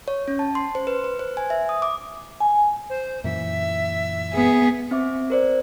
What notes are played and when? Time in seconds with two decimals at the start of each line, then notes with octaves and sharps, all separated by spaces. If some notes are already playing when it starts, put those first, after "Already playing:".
0.08 C#5
0.28 C#4
0.39 A5
0.55 C6
0.75 C5
0.87 B4
1.04 B4
1.19 C5
1.37 G#5
1.50 E5
1.69 D#6
1.82 D6
2.40 G#5
2.90 C5
3.24 F#2 A#2 E3 E5
4.34 B3 G#4
4.91 C4 E5 D6
5.30 A#4 C5 D5